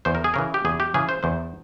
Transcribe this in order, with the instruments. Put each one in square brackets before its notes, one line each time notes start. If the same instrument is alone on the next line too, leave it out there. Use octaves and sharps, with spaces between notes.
[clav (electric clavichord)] E2 C5
A#4
G#4
C#3 E3 A#4
G4
E2 G#4
G4
C#3 E3 G#4
C5
E2 C5